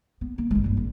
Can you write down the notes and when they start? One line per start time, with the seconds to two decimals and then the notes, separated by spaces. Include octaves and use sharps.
0.21 B3
0.38 A#3
0.51 G#1 G#3
0.64 G2 A#2
0.77 G#1